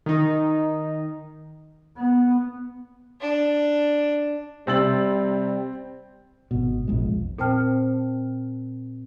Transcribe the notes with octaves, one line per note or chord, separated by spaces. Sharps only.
D#3 D#4
B3
D4
C3 G3 C4 E6 A6 F#7
G#1 B2
E1 A#1 F2 G#3
A#2 C4 C5 G5 A5 F6